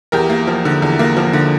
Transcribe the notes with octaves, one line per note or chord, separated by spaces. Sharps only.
E2 G4 A#4
A#3
F3
D3
E2
A#3
F3
D3